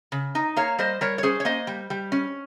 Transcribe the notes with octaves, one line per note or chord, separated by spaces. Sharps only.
C#3
D#4
A#3 C#5 F5
G3 C5 D#5
G3 A#4 C#5
C#5
C#4 G#4 C5
C#5
A#3 C5 D#5
G3
G3
C#4